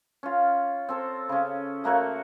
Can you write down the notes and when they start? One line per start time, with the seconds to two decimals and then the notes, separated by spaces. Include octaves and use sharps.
0.23 C#4 F4
0.89 C4 A4 C#5
1.29 C#3 C#4
1.84 A3 A#3 F#4 C#5